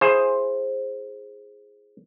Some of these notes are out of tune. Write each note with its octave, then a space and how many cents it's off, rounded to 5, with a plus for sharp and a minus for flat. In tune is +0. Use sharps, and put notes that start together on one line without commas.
E4 +20 G#4 +0 C5 +15